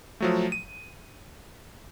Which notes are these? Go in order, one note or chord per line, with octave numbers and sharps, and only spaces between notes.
F3 F#3 A3
D#7